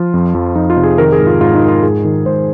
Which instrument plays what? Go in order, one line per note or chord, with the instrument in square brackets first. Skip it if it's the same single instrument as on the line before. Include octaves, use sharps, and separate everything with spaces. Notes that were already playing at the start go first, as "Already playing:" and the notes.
Already playing: [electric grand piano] F3 F4
F2
F2
F2 D#4
F4
C3
G#4
D#3 A#4
G#4
G#2
F4
G#2 F4
D#4
G#2
F4
G#2 G#4
D#3
G#2 C5